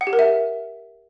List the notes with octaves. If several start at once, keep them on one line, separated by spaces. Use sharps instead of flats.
F#5
G4
A#4
E5